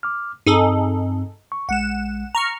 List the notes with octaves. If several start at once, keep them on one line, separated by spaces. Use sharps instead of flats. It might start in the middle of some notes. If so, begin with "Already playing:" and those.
D6 F6
G2 C4 D#4 G#4 A4
C#6
A#1 G#3 F#5 E7
A#5 C#6 F6